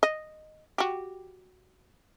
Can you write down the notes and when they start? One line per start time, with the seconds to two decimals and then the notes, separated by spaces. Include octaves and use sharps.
0.03 D#5
0.78 F#4 G4